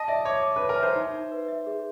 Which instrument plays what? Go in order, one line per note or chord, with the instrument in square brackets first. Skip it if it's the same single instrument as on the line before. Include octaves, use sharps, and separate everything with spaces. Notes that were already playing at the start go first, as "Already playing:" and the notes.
Already playing: [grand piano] D#5 [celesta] A5
[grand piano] D5 [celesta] E5
[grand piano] C#5 [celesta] D6
[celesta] D6
[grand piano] B4 [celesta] C#5
[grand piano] A#4
[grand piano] C5 [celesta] E5
[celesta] D#4
D#4
B4
E5
G#4